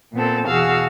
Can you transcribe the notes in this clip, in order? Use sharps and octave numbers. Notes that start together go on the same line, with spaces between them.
A#2 B3 C4 A4
E2 B2 F#4 G#4 F5 E6